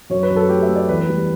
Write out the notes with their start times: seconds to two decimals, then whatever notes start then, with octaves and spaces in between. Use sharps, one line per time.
0.10 F#2 C#5
0.23 B4
0.30 F#2
0.36 A4
0.49 A3 G4
0.62 E5
0.69 A3
0.76 D5
0.89 E2 B4
1.09 G3